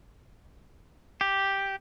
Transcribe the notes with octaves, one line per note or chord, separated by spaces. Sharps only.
G4